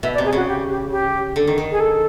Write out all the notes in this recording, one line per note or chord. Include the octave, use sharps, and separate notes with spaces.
B2 E5
D5
C3
G#4
C#3 F#4
G4
G4
G4
D3
D#3
D#3
G#4
A4